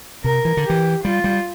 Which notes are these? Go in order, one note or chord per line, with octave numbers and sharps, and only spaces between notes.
C3 A#4
E3
D3
E3 G4
G3 F4
G3